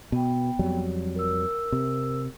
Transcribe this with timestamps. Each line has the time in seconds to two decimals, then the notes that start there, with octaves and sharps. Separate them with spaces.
0.12 B2 B3 G5
0.59 F2 F#3 G3
1.15 A#4 E6
1.72 C3